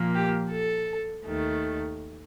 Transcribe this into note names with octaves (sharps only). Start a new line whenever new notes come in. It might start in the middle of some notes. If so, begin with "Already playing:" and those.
Already playing: A#2 F3 A#3
G4
A4
D#2 D#3 A3